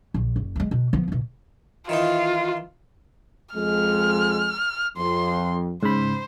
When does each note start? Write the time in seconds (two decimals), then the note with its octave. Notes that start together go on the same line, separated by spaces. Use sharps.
0.14 A#1
0.36 F#1
0.56 F3 G#3
0.71 B2
0.93 F3 B3
1.08 C2 B2
1.89 D#3 E3 D#4 F4
3.55 F2 G#3 F6
4.97 F2 C6
5.83 G#2 C#3 C5 B5